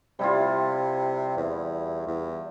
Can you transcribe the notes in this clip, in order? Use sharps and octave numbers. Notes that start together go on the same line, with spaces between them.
C3 G3 E4 F4
E2
E2